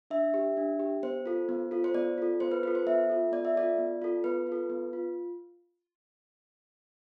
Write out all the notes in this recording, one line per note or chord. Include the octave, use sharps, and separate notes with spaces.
D4 E5
G4
D4
G4
B3 C5
F4 A4
B3
F4 A4
C5
B3 D5
F4 A4
B3 C5
B4
F4 A4 B4
C5
B3 E5
F4 A4
B3 D5
E5
F4 A4 D5
B3
F4 A4
B3 B4
F4 A4
B3
F4